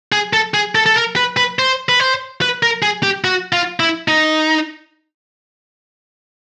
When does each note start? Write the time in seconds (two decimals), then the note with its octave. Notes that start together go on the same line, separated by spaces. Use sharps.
0.12 G#4
0.33 A4
0.54 G#4
0.75 A4
0.86 A4
0.96 A#4
1.16 B4
1.37 B4
1.59 C5
1.89 B4
2.00 C5
2.41 B4
2.63 A#4
2.82 G#4
3.03 G4
3.24 F#4
3.53 F4
3.80 E4
4.08 D#4